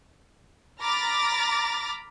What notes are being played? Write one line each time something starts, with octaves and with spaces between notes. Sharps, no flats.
A#5 B5 D6 F6 A6 A#6